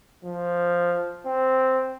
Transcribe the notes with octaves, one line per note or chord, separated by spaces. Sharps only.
F3
C4